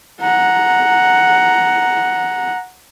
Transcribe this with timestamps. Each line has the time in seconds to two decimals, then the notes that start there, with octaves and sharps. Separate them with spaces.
0.21 F#5 A#5